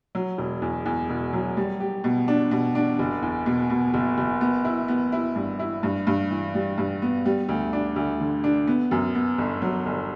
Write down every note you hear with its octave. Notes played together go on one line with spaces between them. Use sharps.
F#3
E1
E2
E2
E1
F#3
G3
G4
B2
D4
B2
D4
F#1
E2
B2
B2
F#1
F#1
B3
E4
B3
E4
G2
E4
G2
G2
E3
G3
G2
B3
G3
D2
D4
D2
D3
D4
B3
F#2
B3
G1
F#3
G1